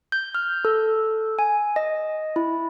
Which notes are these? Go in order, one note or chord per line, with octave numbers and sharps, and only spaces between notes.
G6
F6
A4
G#5
D#5
E4